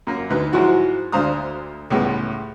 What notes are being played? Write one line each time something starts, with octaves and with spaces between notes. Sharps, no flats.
F#2 A#3
D2 D#4 B4
G#2 F3 F#3 E4 F#4
D2 D4 C5 F5 A#5 D#6
C#2 A2 G3 G#3 B3